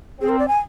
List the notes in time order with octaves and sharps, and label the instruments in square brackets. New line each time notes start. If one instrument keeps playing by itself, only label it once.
[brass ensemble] C4 [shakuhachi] G#4
[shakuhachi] A#4
D5
G#5